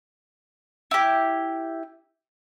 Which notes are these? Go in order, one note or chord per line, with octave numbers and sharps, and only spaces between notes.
E4 G4